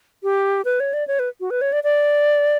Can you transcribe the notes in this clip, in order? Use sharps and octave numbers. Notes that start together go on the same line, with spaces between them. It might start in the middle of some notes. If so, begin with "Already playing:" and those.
G4
B4
C#5
D5
C#5
B4
F#4
B4
C#5
D5
D5